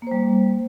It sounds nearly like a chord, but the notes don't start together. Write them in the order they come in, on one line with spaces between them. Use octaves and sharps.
A#3 C5 G3